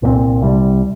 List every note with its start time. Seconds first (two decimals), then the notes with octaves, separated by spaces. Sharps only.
0.02 C2 A#2 G3 C4
0.42 C2 C3 G3